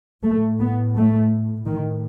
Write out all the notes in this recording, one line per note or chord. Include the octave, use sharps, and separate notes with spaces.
A2 A3
B3
A3
A2 D#3